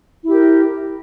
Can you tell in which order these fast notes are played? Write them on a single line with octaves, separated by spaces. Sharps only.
E4 G4 A#4